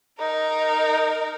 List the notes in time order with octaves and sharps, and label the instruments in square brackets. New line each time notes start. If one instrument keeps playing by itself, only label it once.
[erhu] D#4 [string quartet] A#4